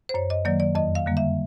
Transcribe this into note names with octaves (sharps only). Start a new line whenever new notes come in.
C5
F#2 C#5
D#5
D#3 F#3 A#3 D5
D5
F2 D#5
F5
D3 G3 A#3
E5